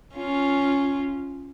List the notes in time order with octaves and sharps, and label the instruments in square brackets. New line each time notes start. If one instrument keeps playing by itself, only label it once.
[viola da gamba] C#4 F4